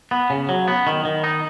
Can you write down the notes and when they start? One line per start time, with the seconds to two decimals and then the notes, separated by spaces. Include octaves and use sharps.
0.11 B3
0.30 C#3
0.49 F#3
0.68 B3
0.87 D#3
1.05 D#3
1.24 D#4